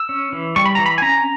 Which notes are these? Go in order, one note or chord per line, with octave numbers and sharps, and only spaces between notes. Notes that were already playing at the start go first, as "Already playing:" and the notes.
Already playing: E6
C#4
E3
G3 C#6
B5
E3 A#5
B5
G#5
C#4 A#5